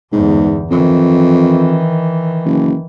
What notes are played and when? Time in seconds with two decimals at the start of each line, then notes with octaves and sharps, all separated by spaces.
0.12 G1 E2 G#2
0.71 F2 D#3 E3
2.45 F#1